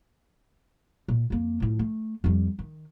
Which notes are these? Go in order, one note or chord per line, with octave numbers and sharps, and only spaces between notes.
A#2
F2 A#3
A2 F3
A3
F2 G3
D#3